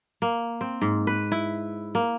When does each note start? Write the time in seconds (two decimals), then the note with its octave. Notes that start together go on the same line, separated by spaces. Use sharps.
0.22 A#3
0.61 C4
0.81 G#2
1.07 B4
1.32 E4
1.95 A#3